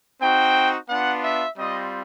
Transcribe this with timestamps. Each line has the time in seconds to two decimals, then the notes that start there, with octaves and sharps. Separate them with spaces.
0.21 C4 D#4 F#4 G5
0.89 B3 D4 F4 F#5
1.24 E5
1.58 G3 C4 F4 D#5